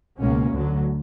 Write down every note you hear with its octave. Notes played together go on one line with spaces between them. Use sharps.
C#2 B2 A#3 C#4
D2 D3 F#3